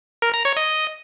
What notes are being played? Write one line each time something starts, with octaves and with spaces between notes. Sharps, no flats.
A#4
A#5
C#5
D#5